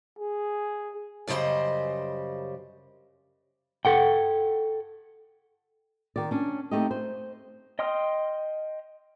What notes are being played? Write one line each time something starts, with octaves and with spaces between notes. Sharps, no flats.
G#4
F#2 C#3 G3 D#4 C5 D#5
A4 F#5 G5
D#3 D5
C#4 D4
A3 C4 D#4 G4 D#5
C5
D#5 G5 C6 D#6 F6